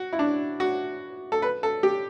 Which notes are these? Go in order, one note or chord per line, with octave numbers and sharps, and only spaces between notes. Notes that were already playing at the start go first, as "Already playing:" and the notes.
Already playing: F#4
E4
D4
F#4
A4
B4
A4
G4